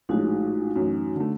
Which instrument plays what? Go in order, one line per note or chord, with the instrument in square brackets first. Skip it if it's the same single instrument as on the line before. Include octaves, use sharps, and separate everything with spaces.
[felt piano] A#1 A2 G#3 [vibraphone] D#4 F#4
[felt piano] A1 F#2
D3 A3